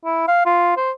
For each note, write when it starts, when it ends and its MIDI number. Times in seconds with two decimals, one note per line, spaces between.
0.05 0.26 64
0.28 0.45 77
0.46 0.75 65
0.77 0.91 72